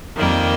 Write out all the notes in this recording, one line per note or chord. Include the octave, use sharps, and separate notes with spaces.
F2 D#3 G3 A#3